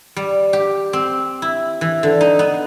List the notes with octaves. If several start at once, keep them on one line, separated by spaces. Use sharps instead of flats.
G3
G4
C4
E4
E3
D3
D#4
B3